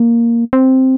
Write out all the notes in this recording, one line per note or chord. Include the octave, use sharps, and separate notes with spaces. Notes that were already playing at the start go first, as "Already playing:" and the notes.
Already playing: A#3
C4